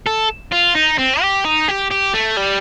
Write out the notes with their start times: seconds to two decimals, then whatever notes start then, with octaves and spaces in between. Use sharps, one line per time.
0.06 A4
0.52 F4
0.75 D#4
0.99 C4
1.22 G4
1.45 D#4
1.68 G4
1.91 G4
2.14 A3
2.37 G3